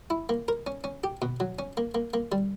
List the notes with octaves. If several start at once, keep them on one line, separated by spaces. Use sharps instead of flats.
E4
A#3
A#4
C#4
C#4
G4
B2
F#3
C#4
A#3
A#3
A#3
G3